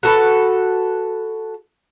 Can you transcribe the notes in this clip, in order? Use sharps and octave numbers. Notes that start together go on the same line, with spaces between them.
F#4 A4 B4